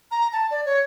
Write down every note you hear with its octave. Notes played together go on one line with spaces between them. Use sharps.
A#5
A5
D5
C#5